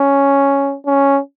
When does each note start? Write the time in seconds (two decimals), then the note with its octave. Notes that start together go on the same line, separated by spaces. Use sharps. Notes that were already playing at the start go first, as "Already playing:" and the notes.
Already playing: C#4
0.86 C#4